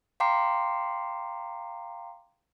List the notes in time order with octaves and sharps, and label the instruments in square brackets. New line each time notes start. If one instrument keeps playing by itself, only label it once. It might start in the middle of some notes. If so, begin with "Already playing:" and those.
[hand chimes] F5 G5 A#5 C6 D6 C7